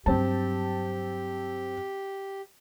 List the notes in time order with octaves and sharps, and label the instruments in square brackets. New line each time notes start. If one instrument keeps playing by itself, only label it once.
[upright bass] G2 F#3 [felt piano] C4 A5 [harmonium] G4